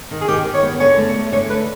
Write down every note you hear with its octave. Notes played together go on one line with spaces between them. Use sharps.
D#3
G#4
D#3 G4
D#3
C#5
B3
D3 C#5
A3
A3
D3 C#5
A3 B4